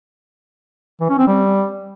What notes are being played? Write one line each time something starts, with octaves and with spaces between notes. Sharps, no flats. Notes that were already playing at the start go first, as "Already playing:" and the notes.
E3
C#4
C4
G3